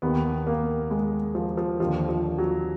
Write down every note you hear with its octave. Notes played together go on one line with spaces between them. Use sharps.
D#2 D#3 B3
A#3
G#3
F3
F3
D#2 D3 F3
F3
F#3